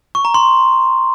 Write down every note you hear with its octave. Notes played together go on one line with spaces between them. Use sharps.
C#6
A#5
C6